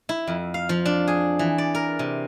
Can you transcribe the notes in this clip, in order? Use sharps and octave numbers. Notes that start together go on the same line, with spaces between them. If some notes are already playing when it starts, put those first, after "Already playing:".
E4
F2
F5
F3
D4
G#4
E3
D5
A#4
C3